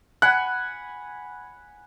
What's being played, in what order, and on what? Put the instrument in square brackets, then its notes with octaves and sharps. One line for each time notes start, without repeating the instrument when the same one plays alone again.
[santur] F#5 G#5 B5 [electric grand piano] F#6